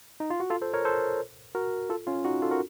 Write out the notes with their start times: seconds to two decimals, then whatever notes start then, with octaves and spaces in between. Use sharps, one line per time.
0.20 D#4
0.30 F4
0.40 F#4
0.50 F4 A4
0.62 A4 C5
0.74 A#4 C#5
0.85 A4 C5
1.55 F#4 A#4
1.89 F4 A4
2.07 C#4 F4
2.25 D#4 F#4
2.42 F4 A4
2.51 F#4 A#4